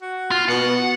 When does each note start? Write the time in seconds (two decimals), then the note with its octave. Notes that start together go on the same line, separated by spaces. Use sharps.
0.02 F#4
0.31 F4
0.48 B2 F#5